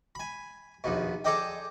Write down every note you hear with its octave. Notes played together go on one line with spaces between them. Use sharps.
G#5 B5
A#1 D#2 B2
G#4 A4 C5 D5 D#5 G5